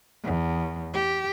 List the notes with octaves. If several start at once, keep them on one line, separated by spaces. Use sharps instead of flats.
E2
G4